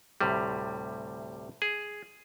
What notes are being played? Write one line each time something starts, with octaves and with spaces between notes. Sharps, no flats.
D2 A2 C3 G3
G#4